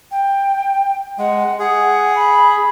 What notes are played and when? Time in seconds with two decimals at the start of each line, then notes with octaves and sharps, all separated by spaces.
0.11 G5
1.18 G#3 F#5
1.59 G#4 F#5
2.15 B5